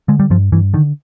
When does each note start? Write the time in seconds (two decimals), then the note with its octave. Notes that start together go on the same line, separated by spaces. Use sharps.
0.08 D3 G#3
0.20 G3
0.30 G2 F3
0.52 G2 E3
0.74 D3 D#3